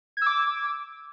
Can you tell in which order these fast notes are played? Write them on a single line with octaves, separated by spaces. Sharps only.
G#6 E6 D6